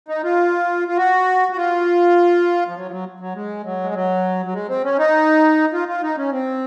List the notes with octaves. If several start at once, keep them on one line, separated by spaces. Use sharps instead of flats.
D#4
F4
F4
F#4
F#4
F4
F3
F#3
F3
F#3
F#3
G#3
F#3
G#3
F#3
F#3
G#3
C4
C#4
D#4
F4
F4
D#4
C#4
C4